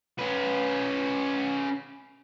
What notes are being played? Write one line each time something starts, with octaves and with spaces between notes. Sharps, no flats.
C#4 B4